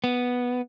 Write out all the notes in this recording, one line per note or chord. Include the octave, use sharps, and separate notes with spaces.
B3